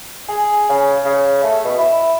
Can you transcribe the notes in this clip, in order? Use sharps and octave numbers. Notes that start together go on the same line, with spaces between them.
G#4
C#3
C#3
A3
B2
E4